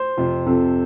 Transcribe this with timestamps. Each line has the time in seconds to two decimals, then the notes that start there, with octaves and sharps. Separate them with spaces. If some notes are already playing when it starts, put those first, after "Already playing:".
Already playing: C5
0.17 F2 C3 F3
0.46 F2 C3 F3 A4